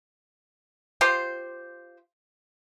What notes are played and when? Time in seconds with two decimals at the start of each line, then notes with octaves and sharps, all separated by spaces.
1.01 F4 G4 C5